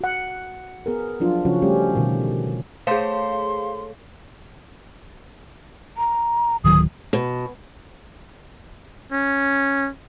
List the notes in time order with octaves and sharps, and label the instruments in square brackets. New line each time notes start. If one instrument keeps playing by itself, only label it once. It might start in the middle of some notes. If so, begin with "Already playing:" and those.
[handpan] F#4 F#5
B3 G#4 A#4
F3 F#3 D4 F4
C#3 F3 C#4 F#4
G3 A3 C#4 G4
B2 D3 D#3
[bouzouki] A3 C5 C#5 [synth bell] G#4 F5 [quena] C6
[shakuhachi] A#5
[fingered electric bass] D1 D#3 F#3 [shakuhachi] D#6
[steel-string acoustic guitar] B2
[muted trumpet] C#4